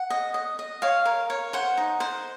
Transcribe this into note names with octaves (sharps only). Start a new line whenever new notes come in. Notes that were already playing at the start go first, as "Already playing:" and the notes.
Already playing: F#5
D#5
D#5
D#5
C#5 F5
A#4
C#5
C5 F#5
D#4
C5